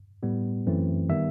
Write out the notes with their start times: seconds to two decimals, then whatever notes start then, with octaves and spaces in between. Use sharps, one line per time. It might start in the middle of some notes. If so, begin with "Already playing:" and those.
0.23 A2 G3 B3
0.66 F#2 E3 A3 C4
1.09 D#3 G3 B3 E5